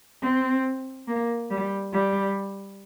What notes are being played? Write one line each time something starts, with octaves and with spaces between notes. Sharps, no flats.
C4
A#3
G3
G3